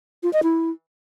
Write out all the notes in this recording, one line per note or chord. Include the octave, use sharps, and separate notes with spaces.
F4
D#5
E4